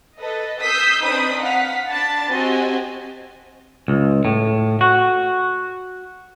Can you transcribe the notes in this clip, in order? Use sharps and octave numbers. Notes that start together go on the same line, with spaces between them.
A4 B4 D#5
D#6 E6 G6 B6 C7
C4 D4 D#4 B4 B5 D#6
F5 F#5 B6
D4 A5 B5 A6
C4 F#4 G4 D#5 G#5
C#2
A2
F#4